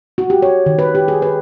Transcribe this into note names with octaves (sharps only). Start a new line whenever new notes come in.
F#4
G4
C#5
D#3
B4
G4
G#4
B4